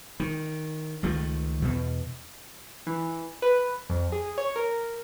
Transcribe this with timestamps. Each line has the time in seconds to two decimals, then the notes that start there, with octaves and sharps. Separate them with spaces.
0.20 D#3
1.03 C#2 D#3 F3 A3
1.62 E2 B2
2.87 E3
3.42 B4
3.90 F2
4.12 G#4
4.38 C#5
4.56 A#4